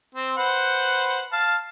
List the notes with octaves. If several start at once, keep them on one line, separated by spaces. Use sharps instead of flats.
C4
B4 C5 F#5
F5 A5